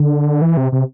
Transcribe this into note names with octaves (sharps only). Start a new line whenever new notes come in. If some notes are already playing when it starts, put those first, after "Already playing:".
Already playing: D3
E3
C3
C3